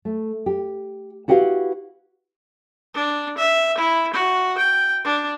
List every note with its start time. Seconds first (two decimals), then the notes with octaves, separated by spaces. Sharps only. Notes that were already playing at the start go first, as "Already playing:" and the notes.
0.05 A3
0.46 G4
1.28 E4 F#4 G4 B4 F5
2.94 D4
3.38 E5
3.77 E4
4.13 F#4
4.58 G5
5.04 D4